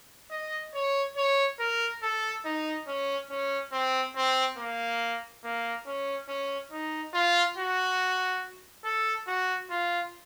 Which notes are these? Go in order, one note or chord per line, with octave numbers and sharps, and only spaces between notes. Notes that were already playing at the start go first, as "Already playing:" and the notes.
D#5
C#5
C#5
A#4
A4
D#4
C#4
C#4
C4
C4
A#3
A#3
C#4
C#4
D#4
F4
F#4
A4
F#4
F4